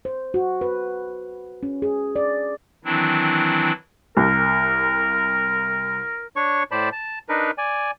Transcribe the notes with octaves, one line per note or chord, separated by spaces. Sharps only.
C5
F#4
B4
C#4
G#4
D5
D#3 E3 F#3 C4 D4 E4
C2 A#4
D4 C#5 C#6
A2 C5 D5 A5 B5
A5
D4 D#4 A#4 B4
D5 G#5